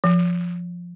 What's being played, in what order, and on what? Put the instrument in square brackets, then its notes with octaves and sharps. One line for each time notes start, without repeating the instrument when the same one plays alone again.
[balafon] F3